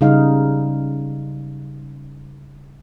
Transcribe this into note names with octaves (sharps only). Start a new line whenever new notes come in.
C#3 G3 D#4 F5